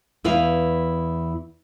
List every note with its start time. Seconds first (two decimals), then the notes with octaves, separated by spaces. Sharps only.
0.24 E2 E4 B4 F5